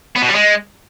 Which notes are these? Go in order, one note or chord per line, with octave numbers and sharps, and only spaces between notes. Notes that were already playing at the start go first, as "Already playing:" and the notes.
B3
B2
G3
G#3